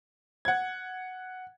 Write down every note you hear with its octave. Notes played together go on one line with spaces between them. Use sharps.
F#5 G#6